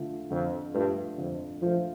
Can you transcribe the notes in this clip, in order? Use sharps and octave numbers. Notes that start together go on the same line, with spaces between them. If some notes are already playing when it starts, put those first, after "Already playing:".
Already playing: D3 A3 F4
F2 D3
G2 A3 F4
F2 D3
F3 A3 F4